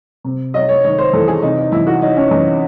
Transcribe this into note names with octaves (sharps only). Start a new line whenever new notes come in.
C3
F#3 D#5
C#5
D#3 C#5
C5
E2 A4
G#4
C3 D#4
D#4
E2 E4
F#4
F#3 D#4
C#4
E2 D#4